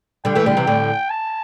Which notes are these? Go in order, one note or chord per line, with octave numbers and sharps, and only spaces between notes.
D3 G3 G5
E3 A3
D3 G3
C3 E3
A2 D3
A5